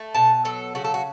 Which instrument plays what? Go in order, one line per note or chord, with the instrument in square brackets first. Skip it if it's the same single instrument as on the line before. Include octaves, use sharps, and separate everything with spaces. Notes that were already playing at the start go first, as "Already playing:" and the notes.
Already playing: [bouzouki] A3
B2 A5
F#3 A4
C#3 F#4
A4
F#4